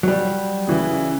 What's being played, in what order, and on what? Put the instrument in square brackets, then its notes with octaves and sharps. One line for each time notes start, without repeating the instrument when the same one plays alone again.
[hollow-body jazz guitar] F#3 G3
[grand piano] C#3 E3